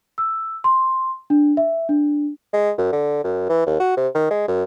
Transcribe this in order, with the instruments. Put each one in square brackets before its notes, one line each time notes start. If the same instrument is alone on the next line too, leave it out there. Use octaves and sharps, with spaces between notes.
[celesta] E6
C6
D4
E5
D4
[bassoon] G#3
F#2
D3
F#2
E3
D#2
F#4
C3
D#3
G#3
F#2